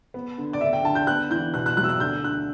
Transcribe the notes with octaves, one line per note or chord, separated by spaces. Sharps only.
B3
D3
D5
D2 E5
G5
D3 A5
G6
B3 F#6
E3 G6
B2 F#6
F#6
F#3 F#6
E6
F#6
D2 G6
D3 F#6